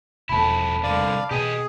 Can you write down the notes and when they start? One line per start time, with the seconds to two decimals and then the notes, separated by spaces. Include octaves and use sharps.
0.29 E1 F2 E4 A5 B5
0.83 C2 D3 D5 F5
1.31 B2 G4 G#4 D#5